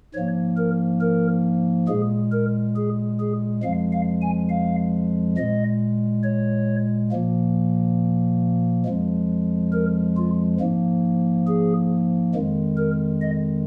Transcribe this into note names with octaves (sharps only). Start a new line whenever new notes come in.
G#2 F3 A#3 C#5
A#4
A#4
A#2 G#3 G#4
A#4
G#4
G#4
F2 F3 G#3 F5
F5
G#5
F5
A#2 G#3 D#5
C#5
A#2 F3 A#3
F2 F3 G#3
A#4
F4
G#2 F3 A#3
G#4
F2 D#3 G#3
A#4
D#5